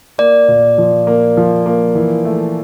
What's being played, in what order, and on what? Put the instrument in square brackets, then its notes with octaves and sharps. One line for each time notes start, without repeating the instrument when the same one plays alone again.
[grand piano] A#3 [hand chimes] D5
[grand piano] A#2
F3
A#3
F3
A#3
E3
A3